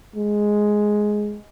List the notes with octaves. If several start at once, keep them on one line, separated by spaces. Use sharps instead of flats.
G#3